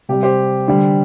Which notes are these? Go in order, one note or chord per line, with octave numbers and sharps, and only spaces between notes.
C3 G3 G4
G4 C5
D3 G3